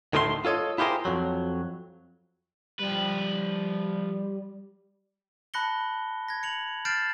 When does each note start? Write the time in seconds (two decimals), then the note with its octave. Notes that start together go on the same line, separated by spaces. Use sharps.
0.13 D2 A2 D#3 A3 D#5 C6
0.45 F4 A4 C#5 D#5
0.78 E4 F4 G4 G#4 A#4 C5
1.05 F2 F#3
2.79 F3 G3 B4
5.54 A5 B5 F#6 A#6 C#7 G7
6.28 G#6 A#6
6.43 C#7 F7 F#7
6.85 F6 G6 A6 C7 D7 E7